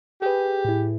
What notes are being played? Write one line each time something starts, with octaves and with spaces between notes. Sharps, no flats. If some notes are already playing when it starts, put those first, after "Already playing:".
G4 G#4 B4
A2 E4